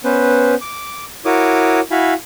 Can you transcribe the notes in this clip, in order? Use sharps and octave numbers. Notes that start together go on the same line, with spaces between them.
B3 C#4 B4 C5
D6
E4 F#4 A#4 C#5 D6 D#6
E4 F#4 F5 G#5 B5